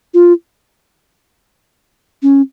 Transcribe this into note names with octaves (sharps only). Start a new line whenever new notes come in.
F4
C#4